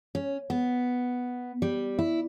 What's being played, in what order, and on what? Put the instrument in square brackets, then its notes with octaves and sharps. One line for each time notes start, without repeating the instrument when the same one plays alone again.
[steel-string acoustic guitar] C#4
B3
G3
E4